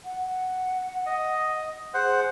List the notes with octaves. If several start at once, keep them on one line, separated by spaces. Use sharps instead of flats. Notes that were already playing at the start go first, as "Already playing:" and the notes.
F#5
D#5
G#4 C5 F#5